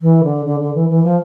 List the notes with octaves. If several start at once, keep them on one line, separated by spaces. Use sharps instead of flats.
E3
D3
D3
D3
E3
E3
F3